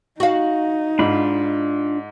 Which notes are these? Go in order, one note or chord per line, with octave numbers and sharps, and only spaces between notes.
D#4 F#4 F5
G#2 D4 F4 B5